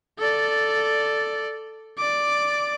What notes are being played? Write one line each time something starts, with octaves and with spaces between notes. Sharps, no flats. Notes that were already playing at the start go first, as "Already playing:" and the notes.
A4 D5
D5 D6